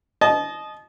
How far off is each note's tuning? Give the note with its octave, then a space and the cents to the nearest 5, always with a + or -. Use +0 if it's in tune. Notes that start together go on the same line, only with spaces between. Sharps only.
D#5 -10 A5 -35